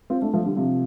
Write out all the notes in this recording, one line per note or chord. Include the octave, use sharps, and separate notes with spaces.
C4 F4
A3 D4
F3 A3
D3 G3
C3 F3